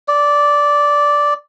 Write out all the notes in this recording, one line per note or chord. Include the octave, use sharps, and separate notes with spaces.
D5